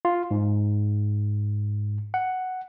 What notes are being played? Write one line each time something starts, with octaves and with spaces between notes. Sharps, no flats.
F4
G#2
F#5